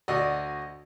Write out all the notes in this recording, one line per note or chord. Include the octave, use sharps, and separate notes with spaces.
D2 F#4 D5 D#5